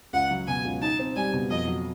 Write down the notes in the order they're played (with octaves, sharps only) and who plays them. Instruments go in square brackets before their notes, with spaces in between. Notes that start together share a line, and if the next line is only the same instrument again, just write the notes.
[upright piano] C#2 [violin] F#5
[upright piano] F#3
[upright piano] B2 [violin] G#5
[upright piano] C#2
[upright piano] D#4 [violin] A5
[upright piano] C4
[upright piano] G3 [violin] G#5
[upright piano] B2
[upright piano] F2 [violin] D#5
[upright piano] F#3